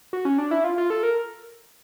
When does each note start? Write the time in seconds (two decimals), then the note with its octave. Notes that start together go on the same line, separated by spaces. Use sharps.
0.13 F#4
0.25 C#4
0.38 D4
0.51 E4
0.64 F4
0.78 F4
0.90 A4
1.03 A#4